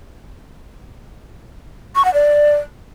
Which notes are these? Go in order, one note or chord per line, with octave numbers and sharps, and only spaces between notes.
C#6
F#5
D5